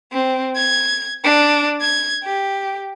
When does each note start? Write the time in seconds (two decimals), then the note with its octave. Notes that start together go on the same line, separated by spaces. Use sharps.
0.12 C4
0.56 G#6
1.24 D4
1.81 G#6
2.23 G4